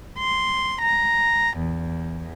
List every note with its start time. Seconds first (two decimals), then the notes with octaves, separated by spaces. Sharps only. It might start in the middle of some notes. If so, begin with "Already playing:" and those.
0.19 C6
0.81 A#5
1.58 E2